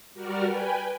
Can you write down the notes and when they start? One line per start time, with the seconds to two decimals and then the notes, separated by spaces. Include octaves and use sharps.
0.14 G3 F#4 A#4 D5 F6
0.45 B4 G5 G#5